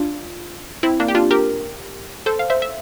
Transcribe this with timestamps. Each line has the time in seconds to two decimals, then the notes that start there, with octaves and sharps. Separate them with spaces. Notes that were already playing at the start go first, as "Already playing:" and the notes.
Already playing: D4 F4
0.83 C4 E4
1.00 A#3 D4
1.08 G4
1.15 D4 F4
1.31 G4 A#4
2.26 A4 C5
2.39 F5
2.50 C5 E5
2.62 E5